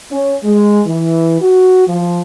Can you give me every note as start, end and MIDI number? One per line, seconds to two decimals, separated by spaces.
0.12 0.36 61
0.44 0.81 56
0.87 1.38 52
1.41 1.88 66
1.88 2.19 53